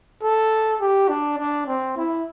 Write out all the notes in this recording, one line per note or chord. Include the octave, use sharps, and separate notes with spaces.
A4
G4
D4
D4
C4
E4